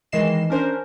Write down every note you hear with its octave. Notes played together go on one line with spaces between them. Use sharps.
D#3 E3 G#3 D#5 C7 E7
C#4 D4 A#4 C5